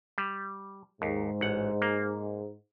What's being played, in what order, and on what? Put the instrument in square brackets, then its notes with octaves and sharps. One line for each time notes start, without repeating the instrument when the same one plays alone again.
[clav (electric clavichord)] G3
[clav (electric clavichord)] D#2 [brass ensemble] G#2
[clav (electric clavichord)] A1 F#5
A#3